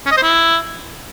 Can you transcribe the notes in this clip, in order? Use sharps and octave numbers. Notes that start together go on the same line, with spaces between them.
C#4
D#5
C5
E4